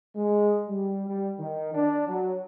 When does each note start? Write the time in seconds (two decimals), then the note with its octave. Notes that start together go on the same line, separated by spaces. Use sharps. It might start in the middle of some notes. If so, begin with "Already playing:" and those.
0.16 G#3
0.68 G3
1.08 G3
1.39 D#3
1.74 D4
2.08 F#3